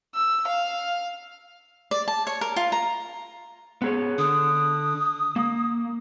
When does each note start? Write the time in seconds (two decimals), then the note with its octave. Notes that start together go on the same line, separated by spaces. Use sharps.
0.15 E6
0.48 F5
1.91 D5
2.08 A5
2.27 C#5
2.41 A#4
2.56 F4
2.72 A#5
3.82 B3 G#4 C#5
4.18 D3 D#6
5.36 A#3